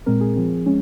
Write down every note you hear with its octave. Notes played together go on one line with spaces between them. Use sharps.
A#2 G#3 C4 A#4
G#4
F3 C4
G#3 C#4